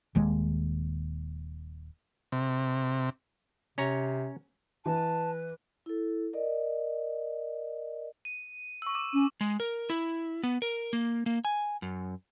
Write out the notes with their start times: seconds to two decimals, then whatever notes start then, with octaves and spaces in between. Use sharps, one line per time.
0.15 D#1 D#2 G#3
2.32 C3
3.78 C3 C#4 C#5 A#5
4.86 E3 B4 A5
5.86 E4 A4
6.33 A#4 D5 D#5
8.25 D#7
8.82 C#6 E6
8.95 D6
9.13 C#4
9.41 G#3
9.60 A#4
9.90 E4
10.43 B3
10.62 A#4
10.93 A#3
11.26 A#3
11.45 G#5
11.82 F#2